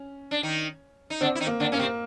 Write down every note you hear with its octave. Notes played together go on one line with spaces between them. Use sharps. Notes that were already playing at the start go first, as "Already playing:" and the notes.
Already playing: C#4
D4
D#3 D#4
D#4
D3 C4 D4
E4
D#3 D#4
A#3
D3 D4
A#3 C#4
C3 C4